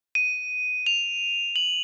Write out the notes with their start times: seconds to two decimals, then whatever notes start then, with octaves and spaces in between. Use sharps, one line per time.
0.15 D#7
0.86 F7
1.56 F#7